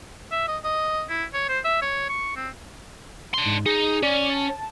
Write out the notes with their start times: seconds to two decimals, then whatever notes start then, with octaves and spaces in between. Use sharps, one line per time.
0.31 E5
0.48 D#5
0.64 D#5
1.10 E4
1.34 C#5
1.49 C5
1.65 E5
1.82 C#5
2.09 C#6
2.36 C4
3.34 D4 C6
3.45 G#2
3.66 D#4 G#4
4.03 C#4 D5
4.30 A5